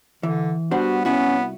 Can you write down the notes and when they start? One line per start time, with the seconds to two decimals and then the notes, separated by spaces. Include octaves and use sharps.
0.23 D3 E3
0.71 G3 B3 D4 F#4 C5
1.05 C2 B3 C#4 E4 F#4